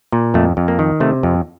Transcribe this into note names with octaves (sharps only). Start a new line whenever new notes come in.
A#2
F2 A3
F2
A#3
D#3
C3 A3
F2